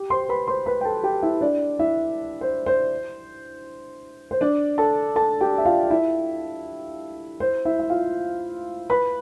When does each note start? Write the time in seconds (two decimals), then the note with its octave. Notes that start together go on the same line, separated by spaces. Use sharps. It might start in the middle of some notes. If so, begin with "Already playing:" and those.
Already playing: G4 G5
0.10 C5 C6
0.29 B4 B5
0.48 C5 C6
0.66 B4 B5
0.81 G5
0.85 A4 A5
1.03 G4 G5
1.22 E4 E5
1.41 D4 D5
1.79 E4 E5
2.41 C5
2.66 C5
4.31 C5
4.41 D4 D5
4.78 A4 A5
5.16 A4 A5
5.41 G4 G5
5.58 E5
5.65 F4 F5
5.90 E4 E5
7.40 C5
7.65 E4 E5
7.79 E5
7.90 F4 F5
8.90 B4 B5